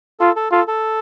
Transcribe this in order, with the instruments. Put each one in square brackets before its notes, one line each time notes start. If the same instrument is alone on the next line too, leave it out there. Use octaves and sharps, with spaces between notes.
[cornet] F4 [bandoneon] A4
[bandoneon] A4
[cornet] F4 [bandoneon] A4
[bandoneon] A4